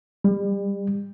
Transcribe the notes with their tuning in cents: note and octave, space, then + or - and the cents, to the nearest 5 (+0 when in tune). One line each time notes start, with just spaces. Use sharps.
G3 +35